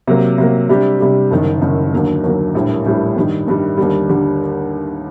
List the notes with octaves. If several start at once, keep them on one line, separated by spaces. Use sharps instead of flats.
C3 F#3 A#3
C3 F#3 A#3
C3 G3 D4 G4
C3 G3 D4 G4
F#1 F#2 D#3
F#1 F#2 D#3
D#2 D3 F#3 A#3
D#2 D3 F#3 A#3
A#1 A2 G3
A#1 A2 G3
G2 D#3 G3
G2 D#3 G3
D#2 D3 G3
D3 G3